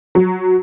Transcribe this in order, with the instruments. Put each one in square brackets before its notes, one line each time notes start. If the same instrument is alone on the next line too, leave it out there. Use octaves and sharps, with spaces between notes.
[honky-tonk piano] F#3